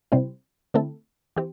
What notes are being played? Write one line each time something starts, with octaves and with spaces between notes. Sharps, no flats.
C3 G3 C4 E4 C5
D3 A3 C4 E4 A4
E3 C4 G4